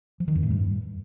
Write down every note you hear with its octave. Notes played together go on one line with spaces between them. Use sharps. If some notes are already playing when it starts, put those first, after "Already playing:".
F3
D#3
F2
A2
G2